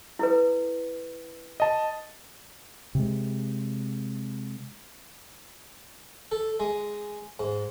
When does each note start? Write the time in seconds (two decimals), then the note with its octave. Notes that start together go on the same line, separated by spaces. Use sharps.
0.19 E4 A4 B4
1.60 D#5 A5
2.95 C3 G#3
6.32 A4
6.60 G#3
7.39 G#2